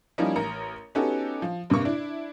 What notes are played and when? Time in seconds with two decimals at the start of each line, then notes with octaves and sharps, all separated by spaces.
0.18 F3 G3 A#3 C#4 D#4 E4
0.36 A1 A#4 A#5 C#7
0.95 B3 C#4 D#4 F#4 G4 A4
1.42 F3
1.70 G2 C3 A#3 C#6
1.85 D4 E4